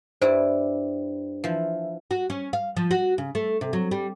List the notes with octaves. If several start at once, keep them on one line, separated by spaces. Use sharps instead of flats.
G2 G3 E4 C5
E3 F3
F#4
C#4
F5
F3
F#4
C#3
A3
C3
F#3
G3